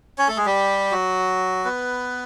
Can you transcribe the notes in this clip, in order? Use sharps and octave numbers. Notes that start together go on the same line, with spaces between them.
C#4 C#5
A3 A4
G#3 G#4
G3 G4
F#3 F#4
B3 B4